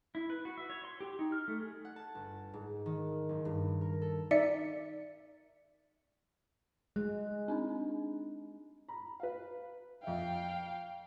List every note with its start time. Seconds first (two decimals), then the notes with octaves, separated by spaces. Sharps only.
0.15 E4
0.30 B4
0.45 F#4
0.57 E5
0.70 C#5
0.85 C6
1.00 G4
1.19 D#4
1.32 F6
1.48 A3
1.60 G#4
1.85 F#5
1.96 A5
2.15 G1
2.54 G#2
2.86 D#3
3.29 F#1
3.45 G2
3.81 A#4
4.02 A4
4.31 D#4 D5 E5 C#7
6.96 G#3 F#6
7.48 C4 D4 D#4
8.88 A#5 B5
9.20 B4 F5
10.03 F2 E5 F5 G5